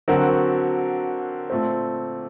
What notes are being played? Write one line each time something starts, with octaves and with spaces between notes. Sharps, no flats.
D3 F#3 C4 F#4 A#4
A#2 A3 C4